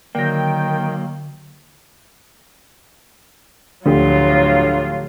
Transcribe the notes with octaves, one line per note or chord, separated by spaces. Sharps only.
D3 D#3 F#3 A#3 G5 A#6
D2 A2 D3 F3 F#3 F4 G4